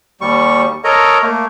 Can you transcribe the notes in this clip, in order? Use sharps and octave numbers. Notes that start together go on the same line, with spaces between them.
D#2 G3 C#6
A4 A#4 C#5 D#5 A#5
A3 A#3